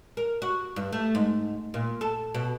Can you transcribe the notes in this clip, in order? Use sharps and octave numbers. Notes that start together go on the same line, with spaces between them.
A#4
F#4
G2
A3
G#2
A#2
A4
B2